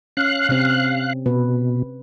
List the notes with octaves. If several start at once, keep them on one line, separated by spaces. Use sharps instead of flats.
C#4 F5 F#6
C3 C4
B2 B4